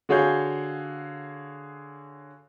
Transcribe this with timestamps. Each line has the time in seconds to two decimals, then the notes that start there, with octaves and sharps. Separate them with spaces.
0.09 D3 F#4 G#4 C#5 F5 G6